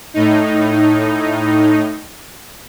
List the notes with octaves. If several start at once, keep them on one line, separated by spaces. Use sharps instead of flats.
A2 D#4